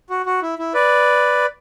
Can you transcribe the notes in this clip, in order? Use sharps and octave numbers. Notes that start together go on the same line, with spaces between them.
F#4
F#4
E4
E4
B4 D5